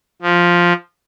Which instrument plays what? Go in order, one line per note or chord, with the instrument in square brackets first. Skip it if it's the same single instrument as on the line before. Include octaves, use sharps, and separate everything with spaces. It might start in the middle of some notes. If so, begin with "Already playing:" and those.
[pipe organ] F3